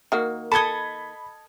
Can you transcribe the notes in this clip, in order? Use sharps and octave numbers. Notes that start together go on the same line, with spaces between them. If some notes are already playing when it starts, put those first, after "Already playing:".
D#3 A#3 F#4
A4 D#5 A5 B5 D#6 G#6 C#7 G7